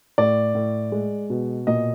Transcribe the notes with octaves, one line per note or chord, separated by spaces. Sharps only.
A2 D5
A2
G#3
B2
A#2 D#5